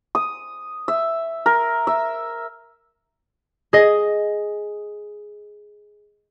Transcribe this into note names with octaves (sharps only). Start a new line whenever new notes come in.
D#6
E5
A#4
E5
G#4 D#5